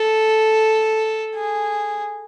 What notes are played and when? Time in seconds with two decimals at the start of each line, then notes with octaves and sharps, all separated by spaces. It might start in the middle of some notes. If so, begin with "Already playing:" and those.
Already playing: A4
1.35 G#4